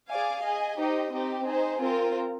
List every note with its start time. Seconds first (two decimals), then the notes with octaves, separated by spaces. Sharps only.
0.09 G#4 D5 F5 G#5
0.43 G#4 D#5 G#5
0.77 D#4 G4 C5 D#5
1.11 C4 D#4 G4
1.45 D#4 G#4 C5
1.79 C4 F4 A#4